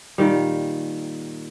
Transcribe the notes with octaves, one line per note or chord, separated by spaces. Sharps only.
A#2 D#3 G3